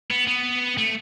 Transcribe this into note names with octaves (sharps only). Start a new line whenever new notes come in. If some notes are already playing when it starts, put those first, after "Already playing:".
B3
B3
A3